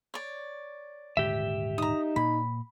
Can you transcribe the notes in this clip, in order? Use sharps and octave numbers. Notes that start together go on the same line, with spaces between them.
C#5 D5
D#1 G#2 D3 G4 E5
D#4 A#5 D#6
A#2 A#3 B5